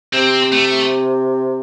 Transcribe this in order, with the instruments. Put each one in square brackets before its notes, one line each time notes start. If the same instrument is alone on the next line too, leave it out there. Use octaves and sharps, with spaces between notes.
[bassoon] C3 [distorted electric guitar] C4
[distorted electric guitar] A3